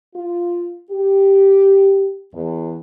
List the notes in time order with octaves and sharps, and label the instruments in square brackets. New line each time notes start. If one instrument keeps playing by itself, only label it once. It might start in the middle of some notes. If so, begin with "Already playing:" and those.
[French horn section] F4
G4
E2